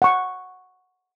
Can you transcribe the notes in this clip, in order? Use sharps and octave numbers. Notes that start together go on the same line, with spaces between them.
F#5 C#6